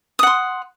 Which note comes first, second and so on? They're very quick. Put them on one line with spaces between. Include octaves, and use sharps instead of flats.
D#6 F#5 C6